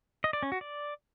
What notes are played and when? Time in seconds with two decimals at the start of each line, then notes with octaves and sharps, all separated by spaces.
0.24 D#5
0.33 D5
0.43 C#4
0.52 F#4
0.61 D5